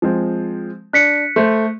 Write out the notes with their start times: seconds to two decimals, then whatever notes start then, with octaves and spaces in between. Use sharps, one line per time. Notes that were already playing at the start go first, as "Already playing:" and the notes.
0.02 F3 G#3 C4
0.93 D4 F#6 B6 C#7
1.36 A3 C5